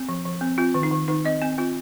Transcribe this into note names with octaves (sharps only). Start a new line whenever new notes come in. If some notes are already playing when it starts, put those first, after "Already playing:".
Already playing: C4
F3
F3
C4
C4 F4
D#3
D#4
D#3
D#3 D#4
C4 D#5
C4 G#5
C4 F4